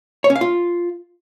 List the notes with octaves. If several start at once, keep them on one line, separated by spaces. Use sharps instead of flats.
C#5
C#4
F5
F4